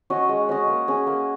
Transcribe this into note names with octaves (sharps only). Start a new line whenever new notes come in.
C#4 F#4 D#5
G#3
C#4 F#4 D#5
A#3
C#4 G#4
A#3